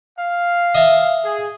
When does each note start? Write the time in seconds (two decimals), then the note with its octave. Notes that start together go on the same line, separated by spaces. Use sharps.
0.17 F5
0.75 D#5 E5 A5
1.23 G#4